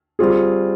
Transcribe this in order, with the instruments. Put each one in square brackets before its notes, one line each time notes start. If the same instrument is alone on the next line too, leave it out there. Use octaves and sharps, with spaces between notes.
[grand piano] G3 C4 F4 G#4